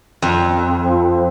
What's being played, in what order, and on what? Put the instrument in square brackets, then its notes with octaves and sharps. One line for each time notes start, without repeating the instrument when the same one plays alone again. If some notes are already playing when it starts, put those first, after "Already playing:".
[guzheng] F2
[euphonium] F3